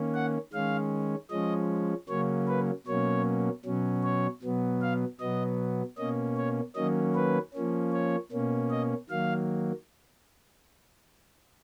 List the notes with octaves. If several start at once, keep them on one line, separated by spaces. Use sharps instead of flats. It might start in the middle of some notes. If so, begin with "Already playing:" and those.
Already playing: D#3 A#3 C#4
F#5
D#3 G#3 C#4 F5
F3 G#3 C#4 D#5
C#3 F#3 A#3 C#4 C#5
B4
B2 F#3 A#3 C#4 C#5
B2 F#3 C#4
C#5
B2 F#3 B3
F5
B2 F#3 B3 D#5
B2 A#3 C#4 D#5
C#5
D#3 F#3 A#3 C#4 D#5
B4
F3 A#3 C#4
C#5
B2 A#3 C#4
D#5
D#3 F#3 A#3 F5